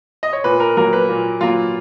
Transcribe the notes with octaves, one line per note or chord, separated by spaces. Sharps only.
D#5
C#5
A#2 B4
A#4
F#3 A#3 A#4
B4
A#2
F#3 A#3 F4